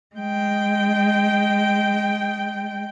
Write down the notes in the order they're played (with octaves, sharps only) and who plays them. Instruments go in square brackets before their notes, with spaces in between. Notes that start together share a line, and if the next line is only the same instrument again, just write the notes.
[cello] G#3 G5